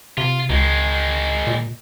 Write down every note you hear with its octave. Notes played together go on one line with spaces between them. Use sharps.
C3 F4
C#2 D#3 G#3
A#2